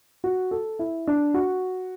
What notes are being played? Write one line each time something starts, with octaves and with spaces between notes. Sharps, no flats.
F#4
A4
E4
D4
F#4